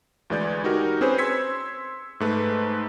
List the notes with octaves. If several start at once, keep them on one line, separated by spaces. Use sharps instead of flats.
D2 E3 G#3 D5 G6
D#4 F#4 G4 A#4
C4 C#4 G#4 B4 C5
C6 E6 G#6 B6 C#7
G#2 A3 B4